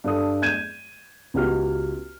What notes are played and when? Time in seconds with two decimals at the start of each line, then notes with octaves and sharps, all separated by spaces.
0.04 G2 A4 D#6
0.42 G6 G#6 D#7 E7
1.34 C#2 B3 F#4 G4 F6